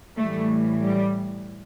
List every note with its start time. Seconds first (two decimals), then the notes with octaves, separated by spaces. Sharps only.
0.17 A2 E3 G3 A3
0.80 G3